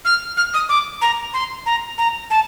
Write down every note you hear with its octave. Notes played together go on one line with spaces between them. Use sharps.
F6
F6
D#6
D6
A#5
C6
A#5
A#5
A5